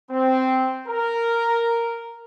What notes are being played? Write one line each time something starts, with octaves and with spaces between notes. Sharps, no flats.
C4
A#4